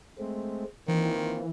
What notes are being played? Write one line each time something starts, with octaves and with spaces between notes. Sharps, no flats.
G#3 A3 C4
D#3 E3 A#3 C4 F4